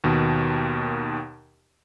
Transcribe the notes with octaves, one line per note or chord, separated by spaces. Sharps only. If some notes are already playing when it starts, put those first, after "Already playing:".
D#2 B2 D#3